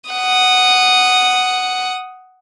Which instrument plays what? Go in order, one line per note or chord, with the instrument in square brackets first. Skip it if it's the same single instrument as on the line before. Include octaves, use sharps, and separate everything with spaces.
[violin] F#5 D#6